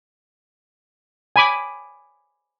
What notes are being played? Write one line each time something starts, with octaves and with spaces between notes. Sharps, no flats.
G#5 B5 D6